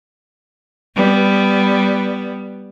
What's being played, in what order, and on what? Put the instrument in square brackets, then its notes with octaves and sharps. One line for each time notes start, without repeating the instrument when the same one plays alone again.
[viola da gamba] G3 B3